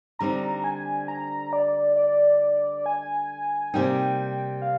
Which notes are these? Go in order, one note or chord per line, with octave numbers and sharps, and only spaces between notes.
D3 G3 C4 D#4 A#5
G#5
A#5
D5
D5
G#5
C3 G3 A#3 D#4 G5
F5